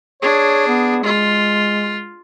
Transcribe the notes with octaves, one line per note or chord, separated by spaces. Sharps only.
D4 G#4 C#5
B3
G#3 F4